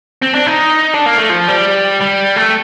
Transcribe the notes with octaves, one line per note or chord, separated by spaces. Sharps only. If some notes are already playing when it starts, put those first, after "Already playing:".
C4
D4
D#4
D4
A#3
A3
F3
G3
G3
A3